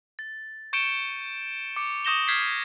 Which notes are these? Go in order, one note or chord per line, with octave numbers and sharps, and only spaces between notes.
A6
C#6 G6 C#7 D7 E7 G7
D6 C#7
C#6 D#6 G6 A#6 E7 G7
F6 G6 G#6 B6 C7